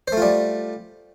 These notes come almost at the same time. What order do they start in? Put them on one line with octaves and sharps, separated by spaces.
C5 A3 F4 G3